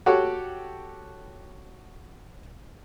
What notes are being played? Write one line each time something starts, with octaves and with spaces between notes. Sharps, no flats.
F#4 G4 A4 C#5 F#5 G5